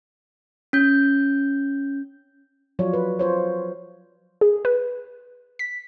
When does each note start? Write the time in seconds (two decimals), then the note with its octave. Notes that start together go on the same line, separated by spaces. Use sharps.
0.73 C#4 G6
2.79 F3 F#3 F4 C#5 D5
2.93 B4
3.19 F4 C5 C#5
4.41 G#4
4.65 B4
5.59 B6